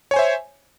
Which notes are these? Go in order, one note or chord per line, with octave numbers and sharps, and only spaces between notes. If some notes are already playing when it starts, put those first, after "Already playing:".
C5 C#5 E5 G#5